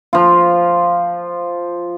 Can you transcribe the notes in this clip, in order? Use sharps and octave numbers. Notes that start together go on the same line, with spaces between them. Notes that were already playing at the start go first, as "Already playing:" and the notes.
F3 F4